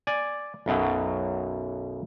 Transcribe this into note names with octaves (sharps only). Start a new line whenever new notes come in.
D5 G#5
B1 F#2 B2 F#3